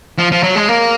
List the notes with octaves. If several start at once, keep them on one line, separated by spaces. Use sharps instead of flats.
F3
F3
F#3
G#3
A#3